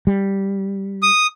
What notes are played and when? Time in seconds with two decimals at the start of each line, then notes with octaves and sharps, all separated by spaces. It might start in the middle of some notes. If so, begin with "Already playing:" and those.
0.07 G3
1.02 D#6